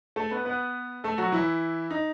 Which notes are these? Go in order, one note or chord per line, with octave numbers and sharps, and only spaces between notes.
A3 A4
B3 B4
B3 B4
A3 A4
F#3 F#4
E3 E4
D#4